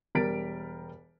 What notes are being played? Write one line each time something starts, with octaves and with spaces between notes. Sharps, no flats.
E1 G3 A#4 A6 B6 D7